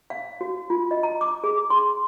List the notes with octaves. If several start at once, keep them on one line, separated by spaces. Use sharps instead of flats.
F5
F#4
F4
D#5
A#5
D6
G#4
C6